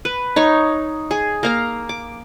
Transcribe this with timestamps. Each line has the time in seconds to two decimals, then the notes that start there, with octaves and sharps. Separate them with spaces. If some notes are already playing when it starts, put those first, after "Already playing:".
0.05 B4
0.36 D#4 C#5
1.11 G#4
1.43 A#3 F5 A#5
1.89 D6